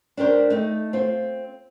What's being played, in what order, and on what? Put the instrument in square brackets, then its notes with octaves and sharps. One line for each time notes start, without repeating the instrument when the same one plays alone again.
[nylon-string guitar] D4 G4 A#4 C5
A3 D#4
C4 F4